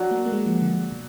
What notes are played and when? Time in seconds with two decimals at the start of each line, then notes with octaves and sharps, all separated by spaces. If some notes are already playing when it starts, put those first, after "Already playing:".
Already playing: F#3 D4 F#4
0.11 A#3
0.26 A#3
0.32 G#3
0.46 F3
0.61 D3
0.92 B2